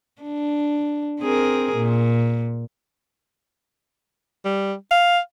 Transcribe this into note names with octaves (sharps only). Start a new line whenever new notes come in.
D4
C4 G#4 A#4
A#2
G3
F5